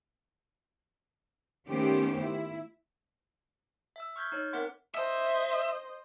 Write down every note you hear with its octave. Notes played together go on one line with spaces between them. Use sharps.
D#3 A3 B3 C#4 G4 C5
E4
E5 E6
C#6 F6 G6 G#6 B6
D#4 C#5 F6
C4 A#4 E5 F#5 C6
C5 D#5 E5